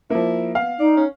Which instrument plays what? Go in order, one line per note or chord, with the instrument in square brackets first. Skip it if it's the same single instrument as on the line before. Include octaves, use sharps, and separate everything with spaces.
[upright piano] F3 A#3 [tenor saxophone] E4
[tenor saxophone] B3 [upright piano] F5
[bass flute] D#4 [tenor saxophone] D5
[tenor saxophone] C#4